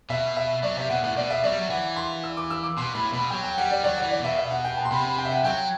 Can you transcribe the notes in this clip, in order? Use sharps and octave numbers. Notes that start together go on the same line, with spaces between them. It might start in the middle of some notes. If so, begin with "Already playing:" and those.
B2 E5
E5
F#3 D5
C3 E5
B2 F#5
A2 F#5
B2 D5
E5
F#3 D5
G3
F#3
E3 F#5
C6
E6
D6
E6
D6
B2 C6
A2 B5
B2 B5
F#3 G5
G5
G3 F#5
D5
E3
F#3 D5
F#5
E3
D5
B2
E5
E5
F#5
G5
A5
C6
C3 B5
B5
G5
E5
F#5
F#3 G5